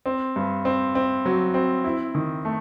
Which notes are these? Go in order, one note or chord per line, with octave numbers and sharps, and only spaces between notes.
C4
G2
C4
C4
F#3
C4
E4
D#3
A3